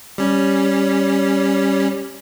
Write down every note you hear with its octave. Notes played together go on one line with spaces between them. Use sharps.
G3 C#4